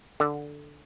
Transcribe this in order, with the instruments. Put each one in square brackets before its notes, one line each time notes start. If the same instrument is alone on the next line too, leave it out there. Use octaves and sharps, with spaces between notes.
[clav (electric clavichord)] D3